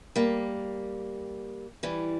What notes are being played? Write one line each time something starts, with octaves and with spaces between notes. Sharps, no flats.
G3 A#3
E3 G3